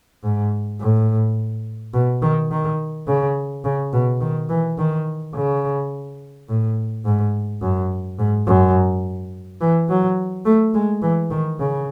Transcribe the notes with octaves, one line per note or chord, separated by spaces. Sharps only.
G#2
A2
B2
D#3
D#3
C#3
C#3
B2
D#3
E3
D#3
C#3
A2
G#2
F#2
G#2
F#2
E3
F#3
A3
G#3
E3
D#3
C#3